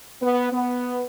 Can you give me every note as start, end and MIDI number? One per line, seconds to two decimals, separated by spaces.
0.22 0.51 59
0.51 1.03 59